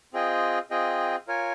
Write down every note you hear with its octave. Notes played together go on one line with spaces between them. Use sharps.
C4 F4 G#4 D#5 G5
C4 F4 G#4 D#5 G5
F4 A#4 C#5 G#5